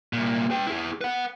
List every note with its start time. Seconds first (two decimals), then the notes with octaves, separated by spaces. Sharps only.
0.13 C2 A#2
0.51 B4 G5
0.67 E4 G#4
1.01 B4 F#5